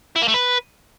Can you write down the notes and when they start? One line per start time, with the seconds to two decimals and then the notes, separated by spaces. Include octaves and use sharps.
0.16 E4
0.22 A#3
0.28 A3
0.34 B4